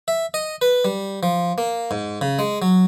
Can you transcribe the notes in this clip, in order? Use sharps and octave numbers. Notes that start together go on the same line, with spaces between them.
E5
D#5
B4
G3
F3
A#3
G#2
C#3
G#3
F#3